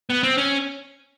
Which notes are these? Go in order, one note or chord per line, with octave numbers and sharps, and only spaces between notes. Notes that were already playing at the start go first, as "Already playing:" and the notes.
B3
C4
C#4